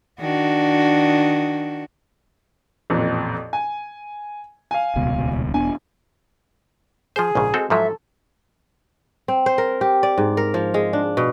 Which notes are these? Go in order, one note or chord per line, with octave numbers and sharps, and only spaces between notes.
D#3 D4 F#4
A1 F2 A#2
G#5
F5 G#5
D#1 C#2 B2
E1 B3 D4 G#5
F3 G#4 C5
A#1 G#2 C#3
G#3 C4 F#4 A4
G#2 F3 F#3 A4 E5
C4
C5
A#4
G4
D5
G#2
A#4
F3
G#3
D4
B2